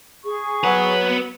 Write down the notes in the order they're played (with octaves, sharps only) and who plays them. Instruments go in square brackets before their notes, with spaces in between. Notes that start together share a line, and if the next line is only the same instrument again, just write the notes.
[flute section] G#4 C#6
[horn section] F#3 [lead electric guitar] B3 B4